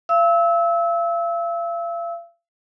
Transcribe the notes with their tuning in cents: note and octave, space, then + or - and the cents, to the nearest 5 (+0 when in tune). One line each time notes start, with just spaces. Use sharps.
F5 -40 E6 -25